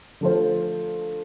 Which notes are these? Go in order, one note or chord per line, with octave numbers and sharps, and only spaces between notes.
D3 F3 A3 F4 C5